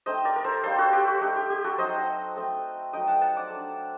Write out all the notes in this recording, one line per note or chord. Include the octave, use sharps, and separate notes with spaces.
A3 C4 D#4 C5 D#5
A#4 D5
A#4
A4 C5
G3 A#3 D#4 A4 C5
F#4 A4
G4
F#4
A3 D#4 G4
G4
G4
F#4 A4
F#3 C4 D#4 C5 D#5
A3 C4 D#4
F#3 A3 D#4 D#5 G5
F#5 A5
F#5 A5
D5 F#5
A3 D4